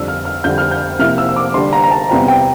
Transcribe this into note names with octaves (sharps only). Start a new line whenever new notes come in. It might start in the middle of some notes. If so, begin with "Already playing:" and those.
Already playing: F2 D3 G3 D4 E6
F6
F6
F2 D3 G3 G6
F6
G6
C3 F3 A#3 E4 F6
E6
E6
D6
D3 G3 D4 C6
A#5
A#5
A5
E2 C3 G3 C4 F4 A#5
G5